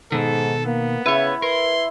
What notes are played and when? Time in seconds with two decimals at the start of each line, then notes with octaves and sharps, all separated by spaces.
0.12 G#2 B2 D#3 A4
0.66 A#3 B3
1.06 C#3 E4 B4 C#5
1.42 A#4 B4 C6